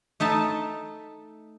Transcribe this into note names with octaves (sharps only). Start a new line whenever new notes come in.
A3 D#4 E5 A5